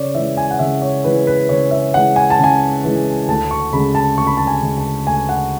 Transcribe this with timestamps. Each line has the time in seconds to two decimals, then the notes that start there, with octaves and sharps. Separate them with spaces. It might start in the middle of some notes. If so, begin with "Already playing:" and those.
Already playing: C#3 C#5 D5
0.15 E3 G#3 E5
0.37 G#5
0.51 F#5
0.59 C#3 E5
0.82 C#5
1.04 E3 G#3 B4
1.27 B4
1.49 C#3 C#5
1.71 E5
1.94 E3 G#3 F#5
2.16 G#5
2.30 A5
2.39 C#3 G#5
2.84 E3 G#3
3.28 D2 A5
3.51 C#6
3.73 C#3 G#3 B5
3.95 A5
4.18 D2 C#6
4.27 B5
4.37 A5
4.47 G#5
4.62 C#3 G#3
4.78 A5
5.07 D2 G#5
5.29 F#5